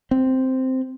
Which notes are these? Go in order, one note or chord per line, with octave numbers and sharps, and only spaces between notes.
C4